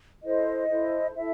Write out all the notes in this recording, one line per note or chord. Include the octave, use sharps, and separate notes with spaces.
E4 A4 C5 D#5
E4 A4 C5
E4 A4 E5